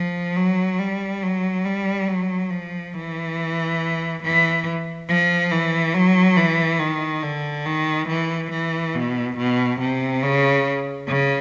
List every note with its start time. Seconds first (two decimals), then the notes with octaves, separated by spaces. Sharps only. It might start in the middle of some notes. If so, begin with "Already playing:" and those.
Already playing: F3
0.37 F#3
0.79 G3
1.23 F#3
1.65 G3
2.08 F#3
2.51 F3
2.94 E3
4.23 E3
5.08 F3
5.51 E3
5.94 F#3
6.37 E3
6.79 D#3
7.23 D3
7.66 D#3
8.08 E3
8.51 E3
8.95 B2
9.37 B2
9.80 C3
10.23 C#3
11.08 C#3